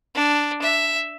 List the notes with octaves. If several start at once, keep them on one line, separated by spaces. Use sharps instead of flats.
D4
E5